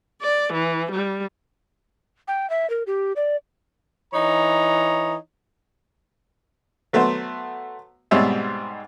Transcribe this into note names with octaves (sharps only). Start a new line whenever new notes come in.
D5
E3
G3
G5
E5
A#4
G4
D5
E3 D#4 C#5 A#5
F#3 A3 B3 F#4 C5
G#2 B2 G3 C4 C#5 E5